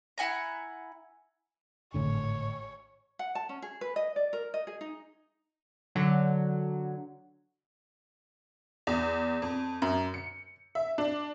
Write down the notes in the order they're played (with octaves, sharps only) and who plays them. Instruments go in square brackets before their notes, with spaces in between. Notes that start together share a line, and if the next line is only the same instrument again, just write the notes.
[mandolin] E4 F#5 G#5 A#5
[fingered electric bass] G#1 A2 D3 [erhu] C#5
[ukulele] F#5
A5
C#4
G#4
B4
D#5
D5
A#4
D#5
G#4
D#4
[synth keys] D3 F#3
[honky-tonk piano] E2
F2
F#2
C#7
E5
D4